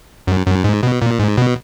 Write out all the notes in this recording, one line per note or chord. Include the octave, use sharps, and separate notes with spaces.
F#2
F#2
G#2
B2
A#2
G#2
B2